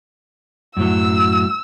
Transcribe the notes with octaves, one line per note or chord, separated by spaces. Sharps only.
F#2 A2 F#3 E6